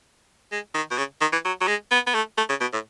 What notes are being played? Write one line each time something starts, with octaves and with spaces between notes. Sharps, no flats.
G#3
D#3
B2
C#3
D#3
E3
F#3
F#3
G#3
B3
B3
A3
A3
C#3
B2
A2